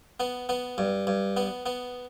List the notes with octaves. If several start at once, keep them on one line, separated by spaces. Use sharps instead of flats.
B3
B3
G2
G2
B3
B3